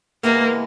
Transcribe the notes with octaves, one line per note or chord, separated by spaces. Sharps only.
C3 E3 G#3 A#3 B3